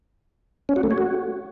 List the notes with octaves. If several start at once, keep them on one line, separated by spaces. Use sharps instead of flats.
C#4
F#4
A3
C#5
F#4